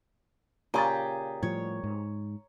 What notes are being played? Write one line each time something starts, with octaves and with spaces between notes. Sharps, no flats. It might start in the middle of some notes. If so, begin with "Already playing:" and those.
A#2 C#3 G4 G#4 A#5 A6
A2 F3 G3 C#5
G#2